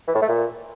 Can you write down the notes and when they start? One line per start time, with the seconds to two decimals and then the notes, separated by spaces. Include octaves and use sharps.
0.08 E3
0.15 A2
0.22 A3
0.29 A#2